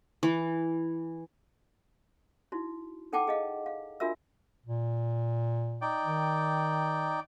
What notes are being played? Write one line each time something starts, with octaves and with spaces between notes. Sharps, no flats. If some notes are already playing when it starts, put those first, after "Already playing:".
E3
D#4 E4 F#4
D#4 A4 F#5 G5 A5 D6
G#4 D#5 F5
F5
D4 F4 F#4 A#4 E5 E6
A#2
D#4 D5 G5
D#3